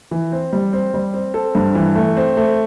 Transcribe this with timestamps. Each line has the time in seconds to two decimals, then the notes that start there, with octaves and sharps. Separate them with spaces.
0.11 E3
0.32 C4
0.53 G3
0.73 C4
0.94 G3
1.14 C4
1.34 C4 A4
1.55 G2
1.75 E3
1.96 A3
2.17 C4
2.37 A3